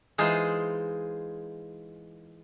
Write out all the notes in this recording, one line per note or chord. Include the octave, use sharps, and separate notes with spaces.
E3 G#3 D#4 F4 G#4 C5